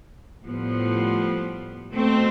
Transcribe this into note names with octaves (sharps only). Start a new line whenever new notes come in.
A2 F3 G3 B3
B2 A3 C4